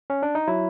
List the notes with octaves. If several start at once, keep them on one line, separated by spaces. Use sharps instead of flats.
C#4
D4
D#4
F#3 E4